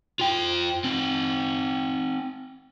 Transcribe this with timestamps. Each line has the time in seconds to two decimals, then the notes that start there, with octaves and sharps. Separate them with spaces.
0.20 F4 G5
0.84 C4 D#4